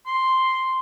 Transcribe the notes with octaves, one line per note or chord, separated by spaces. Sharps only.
C6